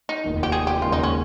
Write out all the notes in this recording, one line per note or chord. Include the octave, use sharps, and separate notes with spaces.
D#4
F1 D#2 D#3
G4
G#4
G4
D#2 C#3 G#3 F4
D#4
C#4